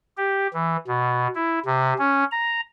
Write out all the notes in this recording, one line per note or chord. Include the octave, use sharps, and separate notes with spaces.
G4
E3
B2
E4
C3
C#4
A#5